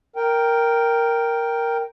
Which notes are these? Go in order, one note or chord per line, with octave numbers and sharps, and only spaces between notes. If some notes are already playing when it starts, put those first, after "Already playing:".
A#4 G5